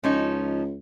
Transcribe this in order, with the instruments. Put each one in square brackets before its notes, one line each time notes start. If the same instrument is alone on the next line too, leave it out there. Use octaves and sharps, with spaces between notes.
[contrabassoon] C#2 [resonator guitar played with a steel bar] F3 C#4 D#4